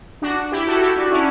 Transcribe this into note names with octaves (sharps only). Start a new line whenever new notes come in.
D4 F#4
E4 G4
F#4 A4
E4 G4
D4 F#4
C#4 E4